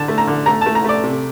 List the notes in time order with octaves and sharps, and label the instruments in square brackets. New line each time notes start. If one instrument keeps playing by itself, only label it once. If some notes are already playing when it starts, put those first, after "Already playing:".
Already playing: [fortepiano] D3 A5
A3
A#5
D3
A3 A#5
A3 A5
A#5
A3 D5
C3